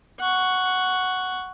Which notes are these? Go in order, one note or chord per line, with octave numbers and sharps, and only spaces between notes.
F#5 C#6